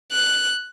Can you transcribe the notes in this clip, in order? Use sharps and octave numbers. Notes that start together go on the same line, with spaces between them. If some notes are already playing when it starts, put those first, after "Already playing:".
F#6